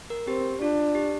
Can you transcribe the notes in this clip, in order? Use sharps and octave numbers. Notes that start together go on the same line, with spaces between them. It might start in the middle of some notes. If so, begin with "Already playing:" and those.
A#4
C4 G4
D4 F4
G4